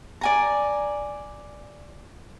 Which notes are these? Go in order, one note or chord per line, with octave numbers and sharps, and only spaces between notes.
D5 G#5 A#5